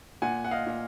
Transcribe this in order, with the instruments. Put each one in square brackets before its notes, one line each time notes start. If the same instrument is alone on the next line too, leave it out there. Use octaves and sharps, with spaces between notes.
[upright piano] A#2 F#5 G#5
F#5
D#5 F5
A#2